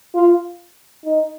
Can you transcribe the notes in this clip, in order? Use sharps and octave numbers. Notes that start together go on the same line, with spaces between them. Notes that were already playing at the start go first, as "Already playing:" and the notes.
F4
D#4